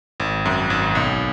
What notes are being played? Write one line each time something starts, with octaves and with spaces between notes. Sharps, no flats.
G#1
F#2
G#1
B1